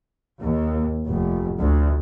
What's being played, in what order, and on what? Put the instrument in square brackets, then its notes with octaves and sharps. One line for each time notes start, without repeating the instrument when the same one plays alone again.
[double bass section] D#2
F1
D2